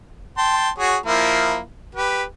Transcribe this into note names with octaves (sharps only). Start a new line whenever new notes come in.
G5 A5 C6
F#4 G#4 C#5
F3 A#3 E4
G4 B4